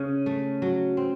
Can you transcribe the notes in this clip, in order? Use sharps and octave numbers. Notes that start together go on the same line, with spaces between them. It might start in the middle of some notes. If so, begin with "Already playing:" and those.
Already playing: C#3 C#4
A3
F#3
C4